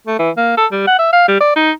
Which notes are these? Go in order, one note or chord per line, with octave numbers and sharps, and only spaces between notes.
A3
E3
A#3
A4
G3
F#5
E5
F5
G3
D5
D#4